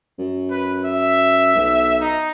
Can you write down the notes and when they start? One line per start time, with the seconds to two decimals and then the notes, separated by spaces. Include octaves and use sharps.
0.19 F#2
0.50 B4
0.85 E5
1.56 B1
2.01 D#4